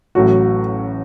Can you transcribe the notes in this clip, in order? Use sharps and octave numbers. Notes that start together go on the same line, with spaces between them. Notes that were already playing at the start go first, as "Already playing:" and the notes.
A1 A2 F#3 F#4